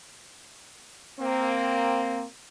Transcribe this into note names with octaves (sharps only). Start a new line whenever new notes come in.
A#3 C4